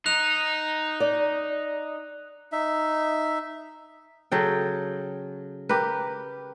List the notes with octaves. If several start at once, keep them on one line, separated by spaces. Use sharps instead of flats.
D#4 F#6 F7
D5
D#4 E5
C#3 F#3 A4 G5
G4 A#4 B4